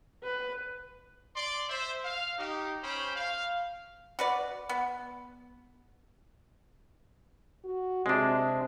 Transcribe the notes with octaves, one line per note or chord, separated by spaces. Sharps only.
B4
D5 C6
C5 E5
F5
D#4 G4
C#4 C5 G5 B5
F5
F#4 B4 D5
B3
F#4
C3 G#3 D4